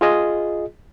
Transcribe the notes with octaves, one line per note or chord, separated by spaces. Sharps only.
F4 G#4 D#5